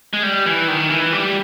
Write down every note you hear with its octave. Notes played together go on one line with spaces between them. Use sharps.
G#3
G3
E3
D#3
E3
G3